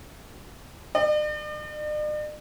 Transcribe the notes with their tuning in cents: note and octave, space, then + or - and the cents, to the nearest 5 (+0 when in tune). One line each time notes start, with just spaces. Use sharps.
D5 +45